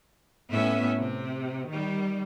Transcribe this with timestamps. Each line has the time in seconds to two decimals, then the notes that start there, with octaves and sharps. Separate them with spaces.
0.51 A2 B3 C#4 E5
0.97 C3
1.68 D#3 G3